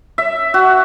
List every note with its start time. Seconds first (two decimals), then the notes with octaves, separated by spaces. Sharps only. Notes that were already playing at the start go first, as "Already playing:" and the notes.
0.18 E5
0.54 F#4